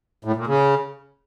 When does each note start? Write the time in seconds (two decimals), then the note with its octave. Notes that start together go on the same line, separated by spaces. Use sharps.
0.25 A2
0.36 A#2
0.47 C#3